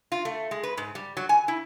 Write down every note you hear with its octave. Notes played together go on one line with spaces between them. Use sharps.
F4
A3
G#3
B4
G#2
G3
F#3
G#5
E4